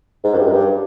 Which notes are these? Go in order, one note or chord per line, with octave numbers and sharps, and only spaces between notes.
G#2
F#2
G2
F#2
G2